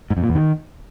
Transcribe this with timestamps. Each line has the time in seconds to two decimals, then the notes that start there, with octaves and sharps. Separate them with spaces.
0.10 G#2
0.17 F2
0.23 A#2
0.29 E2
0.35 D#3